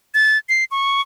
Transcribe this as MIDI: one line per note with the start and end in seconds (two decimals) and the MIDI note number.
0.14 0.38 93
0.49 0.64 96
0.71 1.01 85